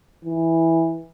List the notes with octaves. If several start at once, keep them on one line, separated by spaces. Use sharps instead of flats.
E3